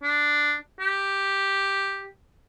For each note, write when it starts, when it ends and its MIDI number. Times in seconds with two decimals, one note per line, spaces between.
0.03 0.55 62
0.80 2.07 67